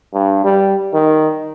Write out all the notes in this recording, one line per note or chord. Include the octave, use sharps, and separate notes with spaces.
G2
G3
D#3